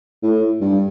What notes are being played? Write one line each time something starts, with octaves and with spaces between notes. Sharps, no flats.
A2
G2